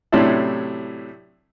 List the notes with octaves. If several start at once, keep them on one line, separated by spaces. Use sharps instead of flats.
A2 C3 F#3 C#4 D4 E4